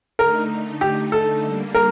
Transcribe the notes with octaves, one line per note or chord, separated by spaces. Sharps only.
D3 A3 D#4 A#4
G4
A4
D3 G3 A#3
A#4